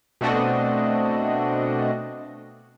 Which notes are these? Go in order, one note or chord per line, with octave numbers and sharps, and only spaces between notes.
B2 A3 C4 D4 F#4 D#5